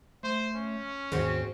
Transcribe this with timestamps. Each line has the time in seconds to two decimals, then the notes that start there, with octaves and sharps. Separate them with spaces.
0.23 A3 C5
0.55 C#4
1.12 D#2 G#2 D#3 G#3 C4 F#4